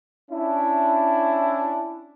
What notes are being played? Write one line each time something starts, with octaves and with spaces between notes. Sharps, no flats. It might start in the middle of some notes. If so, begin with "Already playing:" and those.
C#4 D4 E4